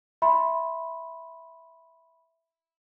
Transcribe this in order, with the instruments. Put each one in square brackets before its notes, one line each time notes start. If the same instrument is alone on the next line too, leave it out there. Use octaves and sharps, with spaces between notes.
[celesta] E5 B5 C6